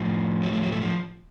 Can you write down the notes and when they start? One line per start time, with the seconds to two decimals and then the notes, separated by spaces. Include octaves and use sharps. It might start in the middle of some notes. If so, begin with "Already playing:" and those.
Already playing: A2 F3
0.43 F#3
0.53 A3
0.63 F#3
0.72 A3
0.82 F3